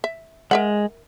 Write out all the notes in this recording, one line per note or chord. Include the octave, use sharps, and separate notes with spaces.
E5
G#3 A#4 E5 F#5